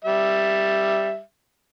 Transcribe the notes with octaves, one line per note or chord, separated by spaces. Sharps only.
G3 E5